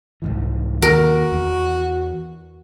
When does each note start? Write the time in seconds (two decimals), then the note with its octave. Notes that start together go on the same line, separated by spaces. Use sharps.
0.22 C2 G#2 E3
0.82 D#2 F#4 A#4
1.32 E2